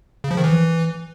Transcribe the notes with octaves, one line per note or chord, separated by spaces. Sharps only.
C#3
F3
D#3
E3